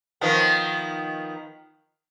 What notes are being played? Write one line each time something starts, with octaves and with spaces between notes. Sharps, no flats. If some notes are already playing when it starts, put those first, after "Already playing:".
D#3 F3 B3